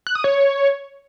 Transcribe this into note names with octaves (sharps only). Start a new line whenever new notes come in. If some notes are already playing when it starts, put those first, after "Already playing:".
F#6
D#6
C#5